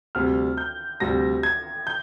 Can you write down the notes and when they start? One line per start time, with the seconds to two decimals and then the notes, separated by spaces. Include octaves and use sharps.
0.15 D2 C3 G3 F6
0.57 G6
1.00 D2 C3 G3 A#6
1.43 G#6
1.87 G6